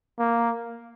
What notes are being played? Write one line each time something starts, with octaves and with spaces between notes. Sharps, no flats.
A#3